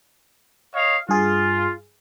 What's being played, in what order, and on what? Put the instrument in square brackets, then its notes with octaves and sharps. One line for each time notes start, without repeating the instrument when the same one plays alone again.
[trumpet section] C#5 D#5 F5
[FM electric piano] G2 G#4 [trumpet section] F4